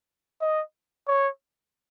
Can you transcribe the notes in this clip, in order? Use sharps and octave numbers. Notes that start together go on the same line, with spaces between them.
D#5
C#5